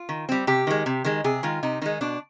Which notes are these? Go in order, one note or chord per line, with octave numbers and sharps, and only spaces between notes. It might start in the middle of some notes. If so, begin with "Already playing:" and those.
Already playing: F4
D#3
G3 C4
C3 G4
D#3 G#3
C3
D#3 G#3
C3 G#4
D#3 G#3 F4
C3 D#4
D#3 G#3 D#4
B2 D4